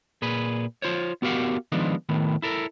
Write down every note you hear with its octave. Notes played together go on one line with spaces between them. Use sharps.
A#2 G#4 B4
F4 C5 C#5
B3 F#4 G4 A#4 F5 F#5
D#3 F3 G#3 B3 D4
A2 D#3 B3
E4 A4 A#4